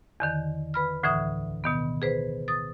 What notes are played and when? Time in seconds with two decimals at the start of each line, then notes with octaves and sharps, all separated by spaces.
0.20 E2 D3 D#3
0.74 B4 B5 F6
1.03 D2 A2 D3 E3 E5 D#6
1.64 B2 D#3 B3
2.02 G#4 B4 C5
2.48 D#6 A6